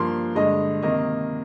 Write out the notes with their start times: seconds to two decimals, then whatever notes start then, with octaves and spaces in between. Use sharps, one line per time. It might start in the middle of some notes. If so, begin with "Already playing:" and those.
Already playing: G2 F3 A#3 C6
0.35 G2 D3 G#3 D#5
0.82 C3 D#3 A#3 D#5